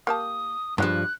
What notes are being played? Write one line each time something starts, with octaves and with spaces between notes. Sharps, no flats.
A#3 G4 A5 D#6
G2 F3 G#3 F4 F#6